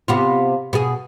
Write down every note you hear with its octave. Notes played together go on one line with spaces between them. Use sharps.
C3 B3 F4
B2 G#4